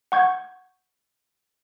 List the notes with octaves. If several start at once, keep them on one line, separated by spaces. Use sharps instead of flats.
F#5 C#6 G6 G#6